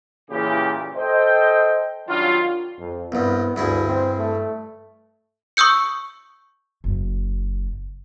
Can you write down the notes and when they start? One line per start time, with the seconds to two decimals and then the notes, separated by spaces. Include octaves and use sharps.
0.30 A#2 C#3 E3 G4
0.96 A4 C5 D#5 G5
2.08 D#3 F#3 G3 D4 F4
2.79 F2
3.12 C2 G2 B3
3.56 D2 G2 E4 G#4
3.88 C4
4.19 A3
5.57 C#6 D#6 E6 G6 C#7
6.84 F#1